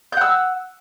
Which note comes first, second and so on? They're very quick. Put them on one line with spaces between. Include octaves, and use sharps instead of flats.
G6 F#5 E6